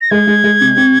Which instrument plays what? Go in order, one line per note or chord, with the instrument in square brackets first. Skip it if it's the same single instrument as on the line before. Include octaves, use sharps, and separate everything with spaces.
[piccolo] A#6
[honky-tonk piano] G#3 [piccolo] G#6
[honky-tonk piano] G#3
G#3
C3
C4